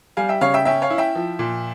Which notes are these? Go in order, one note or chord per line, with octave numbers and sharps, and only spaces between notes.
G3 F5 G#5
E5 G5
C#3 C#5 F5
E5 G5
C#4 E5 G5
C#5 F5
E4
E5 G5
F3
A#2